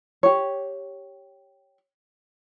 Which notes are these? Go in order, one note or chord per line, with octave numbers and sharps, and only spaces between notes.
G4 C#5